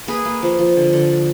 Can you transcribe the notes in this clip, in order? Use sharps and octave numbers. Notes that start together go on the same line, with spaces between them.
A#3 G#4 B4
A#3
F3
F3
D3
D3
D3